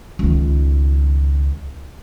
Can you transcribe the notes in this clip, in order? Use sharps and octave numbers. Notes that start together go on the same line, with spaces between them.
C#2 D#3